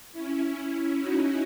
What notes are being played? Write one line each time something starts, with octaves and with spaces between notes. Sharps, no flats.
C#4 E4
C#4 E4
D#4 F#4